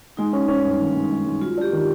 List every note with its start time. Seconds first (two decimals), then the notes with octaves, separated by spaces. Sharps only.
0.17 G#3 D#4
0.33 C#4
0.48 C#4
0.65 G2
0.80 D#3
0.96 G#3
1.11 G#3
1.26 G#3
1.41 F#3 F4
1.57 D4 G4
1.72 D#3